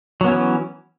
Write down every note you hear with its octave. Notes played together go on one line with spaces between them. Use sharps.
E3 F#3 B3 C#4